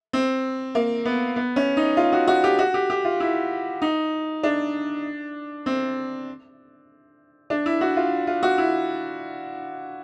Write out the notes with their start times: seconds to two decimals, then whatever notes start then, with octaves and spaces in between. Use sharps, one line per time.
0.13 C4
0.75 A#3
1.05 B3
1.36 B3
1.56 C#4
1.77 D#4
1.97 F4
2.13 F#4
2.28 F#4
2.44 G4
2.59 F#4
2.74 G4
2.90 G4
3.05 F4
3.20 E4
3.82 D#4
4.43 D4
5.66 C4
7.50 D4
7.66 E4
7.81 F#4
7.96 F4
8.27 F4
8.43 F#4
8.58 E4